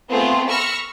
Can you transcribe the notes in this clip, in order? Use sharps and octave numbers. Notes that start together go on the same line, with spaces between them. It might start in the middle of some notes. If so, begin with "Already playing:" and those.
A3 B3 C4 F4 G#4
B5 C#6 E6 F6 A#6 C#7